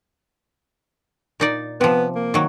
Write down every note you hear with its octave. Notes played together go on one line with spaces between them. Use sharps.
A#2 D#4 D5
C3 F3 B3
A#3
D#3 F#3